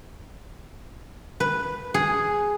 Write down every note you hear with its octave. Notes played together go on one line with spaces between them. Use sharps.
B4
G#4